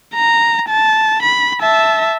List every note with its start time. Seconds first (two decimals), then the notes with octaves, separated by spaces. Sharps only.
0.15 A#5
0.69 A5
1.23 B5
1.61 E5 A5